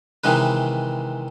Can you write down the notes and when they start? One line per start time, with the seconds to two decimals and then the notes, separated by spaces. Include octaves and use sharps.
0.24 C3 D#3 E3 G#3 B4